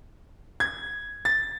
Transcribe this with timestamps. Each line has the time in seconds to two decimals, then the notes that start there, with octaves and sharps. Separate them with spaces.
0.60 G#6
1.25 A6